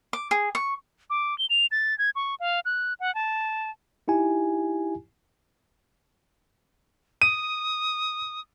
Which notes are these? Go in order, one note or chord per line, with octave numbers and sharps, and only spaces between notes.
D6
G#4
C#6
D6
G7
F7
A6
G#6
C#6
F5
F#6
F#5
A5
D#4 E4 G4 G#5
D#6 D#7